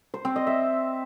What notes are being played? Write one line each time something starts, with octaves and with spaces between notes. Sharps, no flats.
C5
C4
D#5
E5